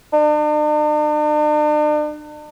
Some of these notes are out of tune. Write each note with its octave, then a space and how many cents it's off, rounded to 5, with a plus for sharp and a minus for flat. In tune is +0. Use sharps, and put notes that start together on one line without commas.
D4 +45